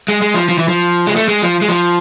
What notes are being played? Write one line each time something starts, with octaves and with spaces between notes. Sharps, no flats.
G#3
G#3
F3
F3
E3
F3
G#3
A3
G#3
F3
G#3
F3